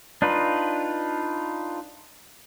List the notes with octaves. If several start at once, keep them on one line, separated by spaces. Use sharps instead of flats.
D4 D#4 F4 B4